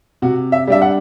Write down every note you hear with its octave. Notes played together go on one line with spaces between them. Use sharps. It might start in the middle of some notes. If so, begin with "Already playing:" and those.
C3 F#4
E5
G3 D4 E5
F#5